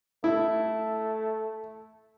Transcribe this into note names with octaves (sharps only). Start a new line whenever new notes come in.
A3 E4